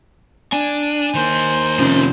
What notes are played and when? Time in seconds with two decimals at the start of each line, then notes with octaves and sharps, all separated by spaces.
0.53 D4 G#5
1.14 D#3 A#3 C5
1.79 C3 F3 C#4